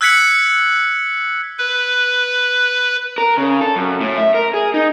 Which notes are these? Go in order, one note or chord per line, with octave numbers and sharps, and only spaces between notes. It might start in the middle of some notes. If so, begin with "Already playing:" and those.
E6 F#6 G#6 B6 C#7 F#7
B4
A#4
C#3
A4
F#2
A2
E5
A#4
G#4
D#4